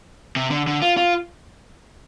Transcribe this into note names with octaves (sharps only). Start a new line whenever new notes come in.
C3
D3
D3
F4
F4